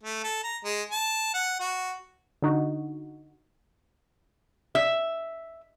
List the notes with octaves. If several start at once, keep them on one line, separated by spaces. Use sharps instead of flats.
A3
A4
A#5
G#3
A5
F#5
F#4
D3 D#4 F#4
E5